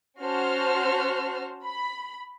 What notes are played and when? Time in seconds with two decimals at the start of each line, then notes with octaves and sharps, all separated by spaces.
0.20 C#4 F#4 C5 A5 C6 F6
1.63 B5